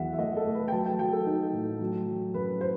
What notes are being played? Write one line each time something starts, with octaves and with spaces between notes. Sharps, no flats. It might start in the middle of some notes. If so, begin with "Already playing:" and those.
Already playing: E2 F#3 E5 F#5
E5
A3 D#5
A4
A3
B4
G5
F#3 A5
G5
F#3 G5
A4
D#4
A2
F#3
F#3
F#2 B4
C5